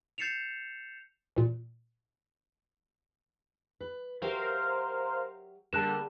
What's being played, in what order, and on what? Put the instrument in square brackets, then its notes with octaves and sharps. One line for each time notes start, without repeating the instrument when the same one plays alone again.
[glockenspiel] G6 A6 C7 C#7 E7 F7
[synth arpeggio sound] A#2 E3
[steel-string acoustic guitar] B4
[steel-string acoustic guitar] F#3 G4 E5 [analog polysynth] A#4 C5 F5
[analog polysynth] D3 G3 [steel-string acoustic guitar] A#3 G#4 A#4 [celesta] A5 F#6 E7